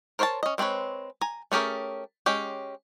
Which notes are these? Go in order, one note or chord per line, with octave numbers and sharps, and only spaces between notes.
A#4 C5 C#5 G5 A5
C#4 D#5
G#3 C4 D4 B4 C#5
G#5 A#5
A3 C#4 G4 G#4 A#4
G#3 C#4 G4